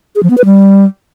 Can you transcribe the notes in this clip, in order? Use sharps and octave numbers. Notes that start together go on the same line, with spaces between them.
G#4
F3
B3
B4
G3